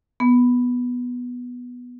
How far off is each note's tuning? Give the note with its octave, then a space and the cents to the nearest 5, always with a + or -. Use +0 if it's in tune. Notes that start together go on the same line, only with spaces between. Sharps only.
B3 -5